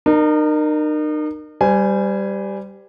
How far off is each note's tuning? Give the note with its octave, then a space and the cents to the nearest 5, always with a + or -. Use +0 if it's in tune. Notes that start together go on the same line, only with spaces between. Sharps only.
D#4 -40 A#4 +0
G3 +0 C5 -40 G#5 +0